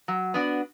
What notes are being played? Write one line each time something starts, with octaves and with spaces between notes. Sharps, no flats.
F#3
B3 D4 F#4